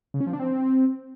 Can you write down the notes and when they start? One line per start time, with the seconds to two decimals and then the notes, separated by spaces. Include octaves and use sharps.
0.14 C#3
0.20 C#4
0.27 F3
0.33 D4
0.40 C4